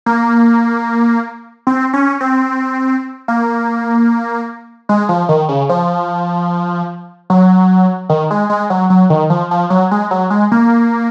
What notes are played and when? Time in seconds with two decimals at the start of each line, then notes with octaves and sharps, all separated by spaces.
0.06 A#3
1.67 C4
1.93 C#4
2.21 C4
3.28 A#3
4.89 G#3
5.09 F3
5.29 D#3
5.49 C#3
5.69 F3
7.30 F#3
8.09 D#3
8.31 G#3
8.50 G#3
8.70 F#3
8.90 F#3
9.10 D#3
9.30 F3
9.51 F3
9.70 F#3
9.91 G#3
10.11 F#3
10.30 G#3
10.52 A#3